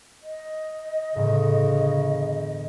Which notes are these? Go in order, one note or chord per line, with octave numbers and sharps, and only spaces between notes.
D#5
G1 E2 A2 C#3